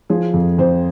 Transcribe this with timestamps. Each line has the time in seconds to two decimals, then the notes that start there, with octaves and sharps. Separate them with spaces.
0.10 F3 G#4
0.33 F2
0.58 F2 C5